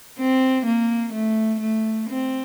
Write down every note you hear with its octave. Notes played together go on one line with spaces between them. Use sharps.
C4
A#3
A3
A3
C4